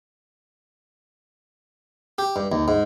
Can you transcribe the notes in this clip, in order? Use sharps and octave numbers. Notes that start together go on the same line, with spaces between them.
G4
G2
D#2
G#2